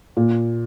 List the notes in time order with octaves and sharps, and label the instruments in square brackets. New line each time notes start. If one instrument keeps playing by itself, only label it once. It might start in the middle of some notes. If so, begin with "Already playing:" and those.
[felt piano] A#2